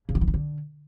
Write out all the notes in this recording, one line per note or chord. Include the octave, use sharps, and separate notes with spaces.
C#3
F#3
E3
D#3
D3